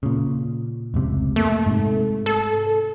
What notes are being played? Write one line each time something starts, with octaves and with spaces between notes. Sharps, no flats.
A#2 C#3
F1 C#2 C3
A3 A#3
G#2 C3
A4